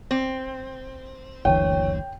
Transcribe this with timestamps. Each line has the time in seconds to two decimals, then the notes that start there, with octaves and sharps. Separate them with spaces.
0.11 C4
1.45 F#1 D2 E3 C#5 G5